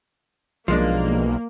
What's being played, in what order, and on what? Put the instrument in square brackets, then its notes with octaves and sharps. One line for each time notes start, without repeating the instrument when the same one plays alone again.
[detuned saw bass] B1 [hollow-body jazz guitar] F3 G#3 D4 [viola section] A#3